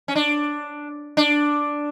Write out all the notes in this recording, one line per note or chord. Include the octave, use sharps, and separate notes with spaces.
C#4
D4
D4